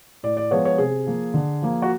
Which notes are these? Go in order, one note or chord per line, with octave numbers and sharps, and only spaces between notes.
A2 D5
D5
F3 G#3 B3 C#5
C#5
C3 G#4
F3 A#3
D3
F3 A#3
F#4